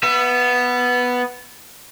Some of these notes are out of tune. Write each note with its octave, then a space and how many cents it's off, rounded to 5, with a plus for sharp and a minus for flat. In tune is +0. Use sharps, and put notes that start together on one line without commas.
B3 +0 E5 +35